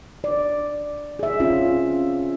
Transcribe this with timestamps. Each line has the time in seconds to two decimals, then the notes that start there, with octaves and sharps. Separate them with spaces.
0.24 D5
1.19 G#4 E5
1.40 C4 C#4 F4